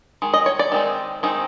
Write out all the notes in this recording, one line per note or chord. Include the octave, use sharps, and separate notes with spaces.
D#3 G#3
D#5
C#5
D5
D#3 G#3 C4 D#4
D#3 G#3 C4 D#4